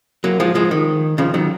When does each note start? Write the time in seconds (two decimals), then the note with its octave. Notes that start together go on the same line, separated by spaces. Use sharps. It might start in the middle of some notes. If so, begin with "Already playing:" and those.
0.24 F#3 A#3
0.40 F3 G#3
0.55 F3 G#3
0.71 D#3
1.18 C#3 F3
1.34 D#3 F#3